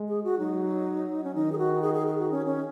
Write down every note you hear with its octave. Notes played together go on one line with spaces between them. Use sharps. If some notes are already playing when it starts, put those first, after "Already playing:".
Already playing: G#3
G#4
F#4
F#3 D#4
C#4
D#3 D#4
G#4
F#4
G#4
G#4
G#4
F#4
C#4
C#4